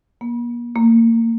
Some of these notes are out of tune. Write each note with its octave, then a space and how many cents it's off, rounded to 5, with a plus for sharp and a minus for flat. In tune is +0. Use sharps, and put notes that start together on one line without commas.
A#3 +40
A#3 -30